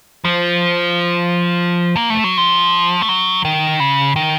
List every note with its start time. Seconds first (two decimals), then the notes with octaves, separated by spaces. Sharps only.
0.25 F3
1.97 A#3
2.10 A3
2.24 F#3
2.37 F3
3.02 A3
3.09 F#3
3.45 D#3
3.80 C#3
4.16 D#3